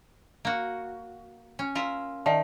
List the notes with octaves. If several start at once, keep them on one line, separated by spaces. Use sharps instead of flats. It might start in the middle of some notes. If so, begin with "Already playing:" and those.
A#3 F#4
C#4
F4 A#4 E5
D#3 D5 E5 A5